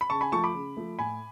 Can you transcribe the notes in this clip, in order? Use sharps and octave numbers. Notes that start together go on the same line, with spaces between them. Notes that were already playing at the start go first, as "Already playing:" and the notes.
B5
C#3 A5 C#6
G#5 B5
F3 A3 A5 C#6
B5 D6
C#3
F3 A3
A2 G#5 B5